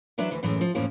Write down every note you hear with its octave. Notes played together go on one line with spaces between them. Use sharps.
E3 F#3 D4 B4 D5 E5
D2 E3 B4
F#2 A2 E3 G#3 A3
F3
F2 A2 E3 F3 A#3 C#4